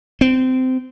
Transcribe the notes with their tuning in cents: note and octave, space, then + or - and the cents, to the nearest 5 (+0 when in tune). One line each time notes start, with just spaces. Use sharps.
C4 -20